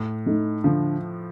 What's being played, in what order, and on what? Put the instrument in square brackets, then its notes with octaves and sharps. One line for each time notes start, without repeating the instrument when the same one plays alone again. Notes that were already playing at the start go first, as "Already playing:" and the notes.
Already playing: [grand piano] A2
[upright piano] A3 D#4
[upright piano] D3 [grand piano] F3